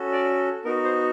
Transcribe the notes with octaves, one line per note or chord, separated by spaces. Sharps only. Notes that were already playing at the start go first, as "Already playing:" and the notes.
Already playing: C#4 F#4 A4
D5
B3 D#4 F#4 A#4
C5